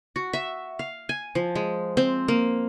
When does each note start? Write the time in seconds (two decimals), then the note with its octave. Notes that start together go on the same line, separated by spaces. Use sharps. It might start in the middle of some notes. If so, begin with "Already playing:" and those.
0.16 F#4
0.33 E5
0.79 F5
1.09 G#5
1.35 F3
1.55 G#3
1.97 C4
2.28 A#3